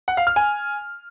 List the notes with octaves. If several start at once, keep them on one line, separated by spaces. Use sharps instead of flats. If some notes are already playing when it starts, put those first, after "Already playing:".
F#5
F5
F6
G#5